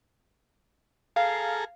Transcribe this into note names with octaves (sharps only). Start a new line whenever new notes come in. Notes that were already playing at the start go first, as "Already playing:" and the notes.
G#4 A4 F5 A#5